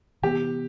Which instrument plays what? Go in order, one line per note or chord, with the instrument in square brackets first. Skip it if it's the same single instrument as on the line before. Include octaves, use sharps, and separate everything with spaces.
[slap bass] C3 E3 B3 [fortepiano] G4